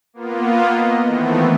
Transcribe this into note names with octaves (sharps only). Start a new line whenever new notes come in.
A#3 B3 F4
D#5
D#3 E3 A3 B3 C4